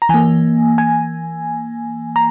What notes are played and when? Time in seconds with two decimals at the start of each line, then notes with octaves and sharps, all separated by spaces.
0.02 A#5
0.09 E3 A#3 G#5
0.78 G#5
2.16 A#5